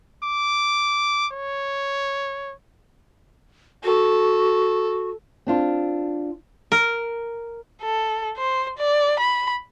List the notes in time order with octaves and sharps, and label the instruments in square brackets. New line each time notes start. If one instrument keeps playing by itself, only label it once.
[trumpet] D6
C#5
[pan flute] F#4 [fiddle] A4
[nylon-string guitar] C4 D4 F4
[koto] A#4
[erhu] A4
C5
D5
B5